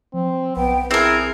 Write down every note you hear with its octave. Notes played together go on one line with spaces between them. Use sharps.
F3 C4
B1 B3 G5
C4 E4 G#4 A#4